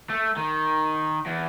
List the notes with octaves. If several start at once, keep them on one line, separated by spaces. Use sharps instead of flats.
A3
D#3
E2